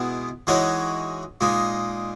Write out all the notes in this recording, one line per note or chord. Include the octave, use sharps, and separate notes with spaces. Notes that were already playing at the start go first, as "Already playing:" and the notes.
Already playing: B2 G#3 B3 E4
E3 G#3 D#4 F#4 C#5
A#2 G#3 D#4